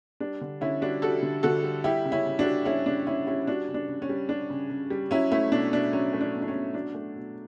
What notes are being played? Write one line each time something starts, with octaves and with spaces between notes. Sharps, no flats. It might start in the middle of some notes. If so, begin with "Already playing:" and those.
G3 D4
D3
D3 C#4 E4
G3 D4 F#4
G3 F#4 A4
D3
D3 F#4 A4
G3
G3 E4 G4
C#3
C#4 E4
C#3
D4 F#4
G3
G3 C#4 E4
C#3 D4
C#3 C#4 E4
G3 C#4 E4
G3 D4 F#4
C#3
D4
C#3
C#4
G3
G3 D4
C#3
C#3
G3
F#3 C#4 E4
A3 C#4 E4
B2 D4
B2 D4
F#3 C#4
A3
D4
B2
D4
C#4
B2
F#3 D4
A3
B2